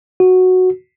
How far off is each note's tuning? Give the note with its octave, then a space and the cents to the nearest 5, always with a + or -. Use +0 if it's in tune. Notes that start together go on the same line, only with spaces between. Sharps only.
F#4 -5